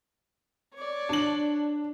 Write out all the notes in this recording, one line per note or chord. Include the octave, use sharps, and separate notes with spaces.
C#5 D5
D4 F#7